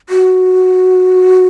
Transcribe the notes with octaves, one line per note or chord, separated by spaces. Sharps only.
F#4